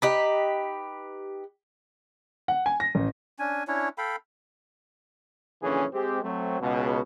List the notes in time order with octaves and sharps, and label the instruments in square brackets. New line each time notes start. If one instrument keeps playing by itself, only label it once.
[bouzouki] D#4 G4 B4
[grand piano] F#5
G#5
A#6
A1
[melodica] C#4 D4 G#5
C#4 D4 E4 C#5
A4 F5 G5 B5
[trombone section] A#1 F#2 D3 E3 C#4 G#4
G#3 C4 G4
F#3 A3 C4
C#2 B2